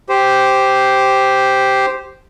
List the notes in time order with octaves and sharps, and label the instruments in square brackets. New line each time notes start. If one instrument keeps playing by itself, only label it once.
[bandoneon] G4 C5